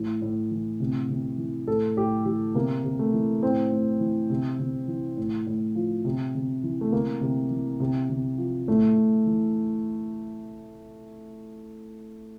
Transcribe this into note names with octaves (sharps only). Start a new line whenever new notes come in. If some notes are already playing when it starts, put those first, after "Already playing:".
Already playing: A2 E3
A2
E3
C3
C3
E3
A2 A4
A2 G4
E3 G4
C3 A#3
C3
A3
E3
A2 C4
A2
E3
C3
C3
E3
A2
A2
F3
C3
C3
E3
A3
C3 A#3
C3
E3
C3
C3
F3
A2 A3
A2
E3